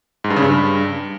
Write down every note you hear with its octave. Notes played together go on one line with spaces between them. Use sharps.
G#2
G2
C#3
G2